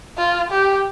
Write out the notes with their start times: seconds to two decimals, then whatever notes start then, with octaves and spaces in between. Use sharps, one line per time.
0.18 F4
0.51 G4